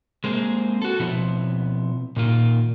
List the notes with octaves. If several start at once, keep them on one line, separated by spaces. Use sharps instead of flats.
G#3 A#3 C4 G#4
F#4 A4
B2 F3 B3 C4 E4
A#2 D#3 A#3 F4